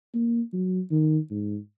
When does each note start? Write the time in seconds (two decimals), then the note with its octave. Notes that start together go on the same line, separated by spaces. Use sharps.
0.14 A#3
0.53 F#3
0.91 D#3
1.31 G#2